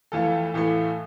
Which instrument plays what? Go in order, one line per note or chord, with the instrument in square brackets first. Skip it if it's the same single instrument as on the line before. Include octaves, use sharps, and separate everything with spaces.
[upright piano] F2 E3 A3 F4 A4
A2 E3 A3